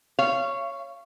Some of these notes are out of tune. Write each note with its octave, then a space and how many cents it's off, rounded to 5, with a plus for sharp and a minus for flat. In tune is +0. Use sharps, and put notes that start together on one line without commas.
C#5 +0 F5 -30